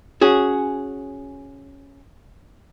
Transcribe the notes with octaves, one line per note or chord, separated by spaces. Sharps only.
C#4 F#4 G#4